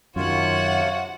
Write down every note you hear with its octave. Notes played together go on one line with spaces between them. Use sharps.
F#2 C3 D#3 F4 F#4 C#5 F#5